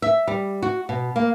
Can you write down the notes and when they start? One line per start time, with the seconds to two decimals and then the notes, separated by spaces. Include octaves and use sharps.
0.02 E5
0.28 G3
0.62 F#4
0.89 B2
1.16 A#3